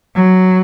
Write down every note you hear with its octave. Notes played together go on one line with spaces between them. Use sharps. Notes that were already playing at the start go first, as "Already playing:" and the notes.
F#3